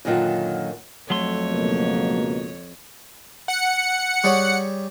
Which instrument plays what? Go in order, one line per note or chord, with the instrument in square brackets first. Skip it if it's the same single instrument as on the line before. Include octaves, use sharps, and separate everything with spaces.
[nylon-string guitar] F#2 A#2 D3 D#3 F#3 F4
[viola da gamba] F2 C#5 [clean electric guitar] F#3 A3 C6
[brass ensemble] C#2 B2 A#3
[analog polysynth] F#5 C#7
[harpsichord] G3 G#4 C#5